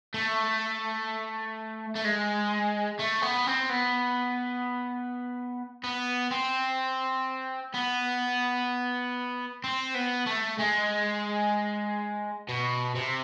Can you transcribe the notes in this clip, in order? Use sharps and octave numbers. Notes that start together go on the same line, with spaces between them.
A3
A3
G#3
A3
B3
C4
B3
B3
C4
B3
C4
B3
A3
G#3
B2
C3